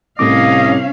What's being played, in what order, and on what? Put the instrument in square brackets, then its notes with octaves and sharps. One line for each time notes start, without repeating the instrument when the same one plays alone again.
[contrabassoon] C2 [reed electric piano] A2 D6 [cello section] C3 C#4 F5 [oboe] D#5